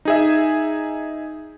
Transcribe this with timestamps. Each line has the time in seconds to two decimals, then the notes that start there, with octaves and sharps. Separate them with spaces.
0.05 D#4 G#4 E5